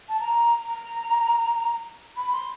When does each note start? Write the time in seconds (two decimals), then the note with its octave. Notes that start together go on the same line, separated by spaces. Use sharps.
0.09 A5
0.20 A#5
0.69 A#5
2.17 B5
2.33 C6